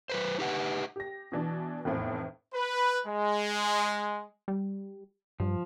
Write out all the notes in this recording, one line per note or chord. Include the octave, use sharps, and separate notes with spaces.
F#3 B4 C5
D#4 G4 B4 F#5
G4 A#6
B2 E3 D4
F1 E2 A2 C4
B4
G#3
G3
G2 F3